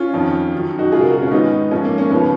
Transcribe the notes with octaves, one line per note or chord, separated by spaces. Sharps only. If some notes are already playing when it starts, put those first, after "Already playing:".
Already playing: C#4 F4
F2 D#3
F#2 D#3
D#4 F#4
C#2 B2 F4 G#4
F#4 A#4
F#4 A#4
C#4 F4
G#2 D#3 B3 D#4
G#2 F3 C#4 F4
A#3
A#3 C#4
D#2 C#3 F3 B3